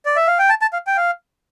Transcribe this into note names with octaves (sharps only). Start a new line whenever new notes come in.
D5
E5
F5
G5
A5
A5
F5
G5
F5